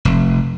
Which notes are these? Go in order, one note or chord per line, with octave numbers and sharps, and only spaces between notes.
F1